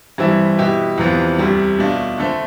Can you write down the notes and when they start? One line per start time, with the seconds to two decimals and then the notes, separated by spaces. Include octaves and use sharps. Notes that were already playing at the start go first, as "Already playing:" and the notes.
0.18 G2 E3 G3 C4 E4
0.58 B2 B3 E4 G4
0.98 E2 C3 F3 B3
1.38 D2 C3 G3
1.78 B2 A3 D4 F4
2.18 D3 A3 C4